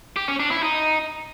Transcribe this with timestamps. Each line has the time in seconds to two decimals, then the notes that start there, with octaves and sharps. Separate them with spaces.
0.16 G4
0.28 C#4
0.40 D4
0.51 E4
0.63 D#4